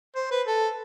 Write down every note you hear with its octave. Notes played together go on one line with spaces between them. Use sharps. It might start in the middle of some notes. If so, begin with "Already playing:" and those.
C5
B4
A4